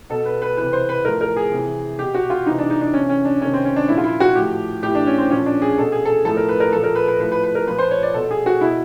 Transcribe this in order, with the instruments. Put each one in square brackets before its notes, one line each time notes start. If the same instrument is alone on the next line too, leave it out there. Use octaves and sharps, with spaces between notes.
[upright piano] B2 A4
B4
B4
C3 E3 B4
C5
B4
A2 F3 A#4
A#4
G#4
C3 E3
B2 G4
F#4
F4
C3 E3 D#4
D4
D#4
D4
C3 E3 C#4
C#4
D4
C3 D#3 C#4
C4
C#4
D4
A#2 F3 E4
F4
E4
F#4
A2 G4
F3
A2 E3 G4
D4
C#4
C4
A#2 F3 C#4
D4
G#4
B2 A4
G#4
A4
A2 F3 A4
A#4
B4
A#4
A#2 F3 A4
A#4
B4
B4
A2 B4
F3
B4
B4
A#4
A#2 F3 B4
C5
C#5
D5
B2 A4
G#4
F#4
B2 E4